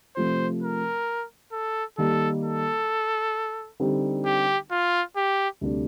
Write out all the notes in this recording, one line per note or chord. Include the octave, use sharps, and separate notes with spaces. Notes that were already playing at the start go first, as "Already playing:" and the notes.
C3 F3 A3 C5
A#4
A4
D#3 G3 A#3 A4
A4
D3 G3 C4 D#4
G4
F4
G4
D2 C3 G3 D4